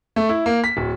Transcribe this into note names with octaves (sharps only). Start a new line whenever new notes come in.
A3
E4
A#3
B6
D1